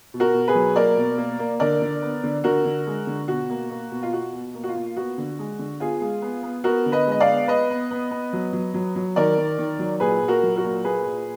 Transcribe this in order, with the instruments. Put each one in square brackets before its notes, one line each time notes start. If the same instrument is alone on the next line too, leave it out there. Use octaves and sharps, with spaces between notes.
[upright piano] B2
F#4 A#4
B2
G#4 B4
F#3
A#3 A#4 D5
B2
A#3
A#3
D3 A#4 D5
D3
B3
D3
D3 F#4 A#4
D3
G#3
D3
B2 F#4
A#3
A#3
B2
F4
B2 F#4
B2
A#3
F#4
F4
A#3
B3 F#4
D3
G#3
D3
B3 F4 G#4
G#3
B3
B3
B3 F#4 A#4
D3
B4 D#5
G#3
D#5
D5 F5
B3
B3 B4 D#5
B3
B3
B3
F#3
F#3
F#3
F#3
D#3 A#4 D5
D#3
D#3
F#3
A#2 G#4 B4
A#2
F#4 A#4
F#3
F#4 A#4
A#2
A#3 G#4 B4
A#2